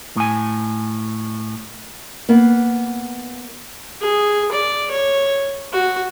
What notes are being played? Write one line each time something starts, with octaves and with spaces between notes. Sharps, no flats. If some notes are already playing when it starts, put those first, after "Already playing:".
A2 G#5
A#3 B3
G#4
D5
C#5
F#4